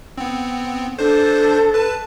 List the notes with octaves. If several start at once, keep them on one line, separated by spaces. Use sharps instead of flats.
B3 C4
D4 A4 C5
B4 A5